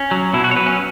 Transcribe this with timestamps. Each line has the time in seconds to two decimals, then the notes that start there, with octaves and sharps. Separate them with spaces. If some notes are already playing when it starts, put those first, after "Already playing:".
Already playing: C#4
0.11 F#3
0.34 B2 E4
0.44 F#4
0.51 C#5
0.56 F#3 B4
0.66 C#4